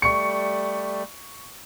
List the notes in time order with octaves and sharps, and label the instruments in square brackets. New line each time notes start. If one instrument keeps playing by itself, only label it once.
[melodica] G3 A3 [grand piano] C#6 C#7